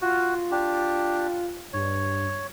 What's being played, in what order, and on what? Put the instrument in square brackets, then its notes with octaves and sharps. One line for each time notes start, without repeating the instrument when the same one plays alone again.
[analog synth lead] F4 [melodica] F#4
[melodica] D4 G4
[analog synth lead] G2 [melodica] C#5